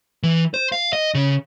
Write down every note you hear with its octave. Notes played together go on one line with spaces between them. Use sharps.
E3
C5
F5
D#5
C#3